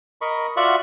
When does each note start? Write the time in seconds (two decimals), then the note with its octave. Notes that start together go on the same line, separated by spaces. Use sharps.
0.21 A#4 D#5 B5 C#6
0.57 F4 F#4 D5 E5 F#5